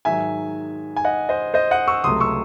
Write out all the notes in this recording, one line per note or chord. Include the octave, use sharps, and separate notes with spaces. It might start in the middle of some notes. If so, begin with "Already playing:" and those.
G#2 D#3 F#3 E5 G#5
G#5
D#5 F#5
C5 D#5
C5 D#5
D#5 F#5
C#6 E6
C#2 C3 F#3 A3 C6 D#6
C#6 E6